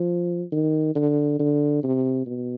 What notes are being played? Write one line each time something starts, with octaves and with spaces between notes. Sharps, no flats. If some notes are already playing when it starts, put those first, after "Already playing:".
Already playing: F3
D#3
D3
D3
C3
B2